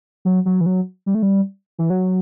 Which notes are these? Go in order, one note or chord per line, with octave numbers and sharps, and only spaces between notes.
F#3
F#3
E3
F#3
G3
A3
G3
E3
F#3